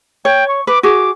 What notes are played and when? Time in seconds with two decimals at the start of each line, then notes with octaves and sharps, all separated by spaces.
0.25 C#5 G5
0.48 C#6
0.67 B4 D6
0.83 F#4 G#4 D6